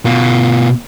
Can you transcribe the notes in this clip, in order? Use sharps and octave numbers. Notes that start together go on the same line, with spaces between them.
B2 F4